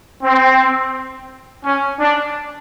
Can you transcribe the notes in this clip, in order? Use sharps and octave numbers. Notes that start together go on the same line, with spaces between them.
C4
C#4
D4